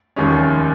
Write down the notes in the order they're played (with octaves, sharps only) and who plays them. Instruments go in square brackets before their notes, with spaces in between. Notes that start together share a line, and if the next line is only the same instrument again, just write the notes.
[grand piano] F1 D#2 D#3 G#3 C#4